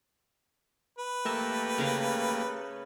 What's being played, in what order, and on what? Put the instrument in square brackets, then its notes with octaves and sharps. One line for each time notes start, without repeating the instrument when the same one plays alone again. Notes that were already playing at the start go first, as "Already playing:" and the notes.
[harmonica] B4
[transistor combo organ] A3 A#3 G4 [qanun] A#4 E5 A5
[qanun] C#3 A#4 F5